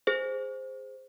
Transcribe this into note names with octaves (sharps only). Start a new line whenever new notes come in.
G#4 C5